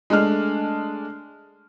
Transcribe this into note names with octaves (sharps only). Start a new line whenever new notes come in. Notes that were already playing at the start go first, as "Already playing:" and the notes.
G#3 A3 D4 F6